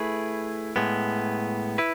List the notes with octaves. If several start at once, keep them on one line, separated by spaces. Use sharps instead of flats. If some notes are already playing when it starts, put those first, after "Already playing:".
Already playing: A3 E4 G#4 B4
A2 G#3 B3
E4 B4